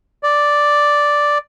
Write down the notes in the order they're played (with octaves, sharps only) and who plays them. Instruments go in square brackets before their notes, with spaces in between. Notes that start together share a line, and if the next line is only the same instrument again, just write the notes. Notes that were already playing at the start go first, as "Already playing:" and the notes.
[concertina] D5